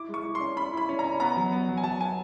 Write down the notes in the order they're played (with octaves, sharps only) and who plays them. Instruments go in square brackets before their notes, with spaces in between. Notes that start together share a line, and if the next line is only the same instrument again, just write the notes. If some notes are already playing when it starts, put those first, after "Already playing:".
Already playing: [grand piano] E4 D6
G#3
C#6
E4
C6
C#4
C#4 B5
E4 B5
C#4
C#4 A#5
B3 A#5
F#3
B3
F#3
G#5
F#3 A5
B3 G#5